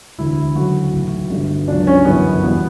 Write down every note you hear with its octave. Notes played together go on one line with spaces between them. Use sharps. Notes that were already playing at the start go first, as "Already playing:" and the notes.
E1 D2 D3 E4
D2 C#3 F#3 F#4
B1 A2 E3
G1 G2 D3 G3
C#2 B2 F#3 D4
C#4
G1 F#2 E3 G3 B3
E2 B2 G3 B3